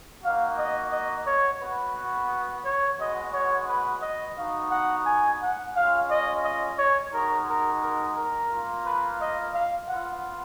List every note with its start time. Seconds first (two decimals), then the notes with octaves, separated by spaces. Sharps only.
0.23 A#3 D#4 F#4 F5
0.57 D#5
0.92 D#5
1.26 C#5
1.61 B3 F#4 B4
2.65 C#5
2.99 G#3 B3 F#4 D#5
3.34 C#5
3.69 B4
4.03 D#5
4.37 B3 D#4 F#4 F5
4.71 F#5
5.06 G#5
5.41 F#5
5.75 G#3 C#4 F4 F5
6.10 D#5
6.44 D#5
6.79 C#5
7.13 G#3 D#4 F#4 A#4
7.48 A#4
7.83 A#4
8.16 A#4
8.51 A#3 F4
8.86 B4
9.20 D#5
9.54 F5
9.89 B3 F4 F#5